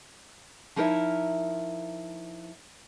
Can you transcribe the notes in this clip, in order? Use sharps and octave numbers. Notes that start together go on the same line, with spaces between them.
F3 D#4 E4 A#4 C#5 E5